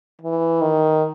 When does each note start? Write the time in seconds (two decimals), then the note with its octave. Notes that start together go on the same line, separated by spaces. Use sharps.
0.21 E3
0.61 D#3